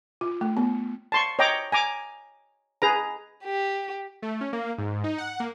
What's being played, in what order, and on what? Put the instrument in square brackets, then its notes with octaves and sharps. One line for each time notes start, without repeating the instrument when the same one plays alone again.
[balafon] F4
A3
B3
[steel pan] A5 C6 C#6
C#5 D#5 G5 A#5 D6
G#5 A#5 D6
G#4 B4 A#5
[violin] G4
[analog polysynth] A3
C#4
A#3
G#2
D#4
F#5
A#3